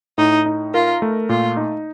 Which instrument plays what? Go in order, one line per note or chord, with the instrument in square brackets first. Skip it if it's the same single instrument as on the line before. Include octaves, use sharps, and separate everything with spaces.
[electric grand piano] A2 [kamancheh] D#4
[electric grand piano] D#4
[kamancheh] F4 [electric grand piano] A#4
[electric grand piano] A3
[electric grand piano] A#2 [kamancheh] F4
[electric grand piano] D#4